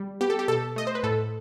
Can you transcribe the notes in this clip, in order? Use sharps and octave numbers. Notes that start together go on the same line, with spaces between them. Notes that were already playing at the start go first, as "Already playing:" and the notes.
Already playing: G3
B3 G4
A4
G4
B2 A4
A3 D#5
C5
B4
A2 A4